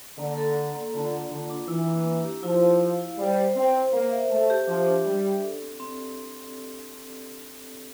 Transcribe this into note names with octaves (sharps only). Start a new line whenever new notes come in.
D3 A#3
A4
A4
A#3
D3 F4
A#3
D3 F4
D4
E3 E4
A#3
A#3
G4
F3 E4
F5
F5
E4
G3 C5
C5
C4 C5
C5
A#3 C5
E5
A3 E5
G4
F3 D4
D4
G3 D4
D5
A4
C4
C4